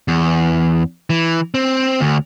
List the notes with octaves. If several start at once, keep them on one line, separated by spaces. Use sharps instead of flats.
E2
E3
C4
D2